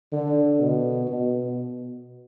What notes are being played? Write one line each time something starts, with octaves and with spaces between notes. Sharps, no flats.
D3
B2
B2